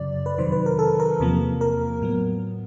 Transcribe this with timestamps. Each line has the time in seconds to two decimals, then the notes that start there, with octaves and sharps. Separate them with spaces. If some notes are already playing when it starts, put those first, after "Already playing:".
Already playing: F#2 C#3 F#3 D5
0.26 B4
0.38 F2 C3 D#3 F#3 C5
0.52 B4
0.66 A#4
0.79 A4
1.00 A#4
1.20 E2 C3 F3 A#3
1.61 A#4
2.01 A2 F#3 B3